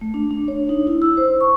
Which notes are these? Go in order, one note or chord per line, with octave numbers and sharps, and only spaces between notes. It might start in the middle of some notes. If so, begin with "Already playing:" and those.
A3
D4
D4
C#5
D#4
E4
E6
C5
C#6